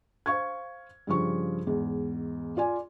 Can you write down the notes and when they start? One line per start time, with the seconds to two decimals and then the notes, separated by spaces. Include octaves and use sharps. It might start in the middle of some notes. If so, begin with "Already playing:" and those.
0.26 C5 F5 C#6 G#6
1.07 G2 C#3 F3 C#6
1.67 E2 G#2
2.57 F4 D5 G#5